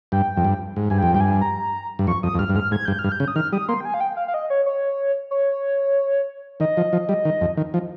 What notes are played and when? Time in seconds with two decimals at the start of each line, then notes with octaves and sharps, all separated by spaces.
0.12 G2 G5
0.37 F2
0.45 G2
0.76 G#2
0.90 G2 G#5
0.98 F2 G5
1.15 G2 G5
1.21 G#5
1.41 A#5
1.99 G2
2.07 F2 C#6
2.23 F2 D#6
2.34 F2
2.39 G2 F6
2.49 G2
2.55 G#2 F6
2.71 G#2 G#6
2.85 G2 G6
2.99 F6
3.04 G2
3.12 G6
3.20 C#3
3.28 D#6
3.36 D#3 F6
3.52 G3 D#6
3.68 A#3 C6
3.80 G5
3.85 G#5
3.94 F5
4.00 G5
4.17 F5
4.28 F5
4.34 D#5
4.50 C#5
4.66 C#5
5.31 C#5
6.60 D#3 D#5
6.77 F3
6.93 F3
7.09 G3
7.25 D#3
7.41 F2
7.57 D#3
7.74 F3